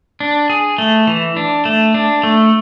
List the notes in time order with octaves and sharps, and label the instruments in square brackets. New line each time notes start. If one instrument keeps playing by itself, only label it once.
[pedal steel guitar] D4
G#4
A3
E3
D4
A3
D4
A3